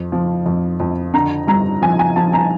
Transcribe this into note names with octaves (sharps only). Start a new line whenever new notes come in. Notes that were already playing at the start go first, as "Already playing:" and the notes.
Already playing: F2
F3
F2
F2
D3 A#5
G2 A#5
F3 G#5
G#5
F3 A5
A#5